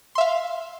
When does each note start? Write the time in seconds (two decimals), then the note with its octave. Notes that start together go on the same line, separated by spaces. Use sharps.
0.15 C6
0.18 E5
0.21 F5